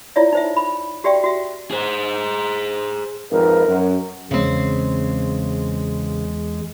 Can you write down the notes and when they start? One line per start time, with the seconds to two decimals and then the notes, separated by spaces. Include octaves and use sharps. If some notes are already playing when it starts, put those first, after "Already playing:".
0.16 E4 F4 C#5 D5 E5
0.33 D#4 C5 E5
0.56 B5
1.04 F#4 G4 D5 E5 G5 C#6
1.24 F#4 E5
1.71 G#4 C5
3.32 G#1 F2 A#4 B4
3.68 F#2
4.31 E2 C#3 G#3 C4